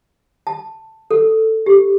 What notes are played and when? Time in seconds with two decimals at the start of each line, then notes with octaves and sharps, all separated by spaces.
0.47 A5
1.11 A4
1.66 G4